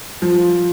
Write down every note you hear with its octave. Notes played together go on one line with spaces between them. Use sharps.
F3